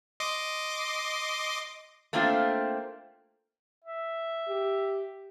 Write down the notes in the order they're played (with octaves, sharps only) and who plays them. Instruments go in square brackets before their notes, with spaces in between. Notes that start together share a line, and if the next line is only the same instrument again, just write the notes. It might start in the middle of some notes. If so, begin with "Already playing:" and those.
[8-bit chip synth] D#5 C6 D6
[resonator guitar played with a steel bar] A3 A#3 C4 D4 F4
[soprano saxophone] E5
[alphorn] G4